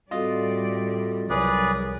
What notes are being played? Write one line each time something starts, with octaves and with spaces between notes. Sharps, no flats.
A2 G3 C4 F4 F#4 A4 D5 D#5
C2 F3 F#3 G#4 A#4 B4 C#5 D5